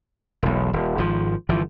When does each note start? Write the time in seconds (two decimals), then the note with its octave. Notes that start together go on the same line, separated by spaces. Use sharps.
0.43 E1 B1
0.73 D#1
0.98 G#1 F3
1.49 G1 E3 F3